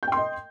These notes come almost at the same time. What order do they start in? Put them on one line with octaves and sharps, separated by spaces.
G6 G5 C6 D#5